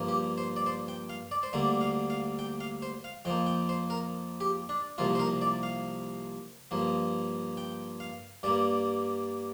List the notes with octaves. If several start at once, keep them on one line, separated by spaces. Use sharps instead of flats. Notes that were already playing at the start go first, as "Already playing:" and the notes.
Already playing: G2 F3 A#3
G4
C5
D5
C5
G5
F5
D5
C5
D2 D3 G3 A#3 D5
F5
F5
G5
F5
C5
F5
F2 F3 A#3 G5
G5
C5
A#4
G4
D4
C2 C3 F3 A#3 F4
C5
A#4
D5
F5
G2 F3 A#3
G5
F5
G2 G3 A#3 D5